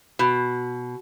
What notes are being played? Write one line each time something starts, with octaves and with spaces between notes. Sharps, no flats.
B2